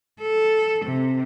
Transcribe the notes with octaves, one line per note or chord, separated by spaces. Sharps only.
A4
C3